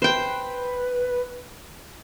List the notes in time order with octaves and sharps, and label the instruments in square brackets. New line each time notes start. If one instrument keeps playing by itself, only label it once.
[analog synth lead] B4 [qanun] C5 G5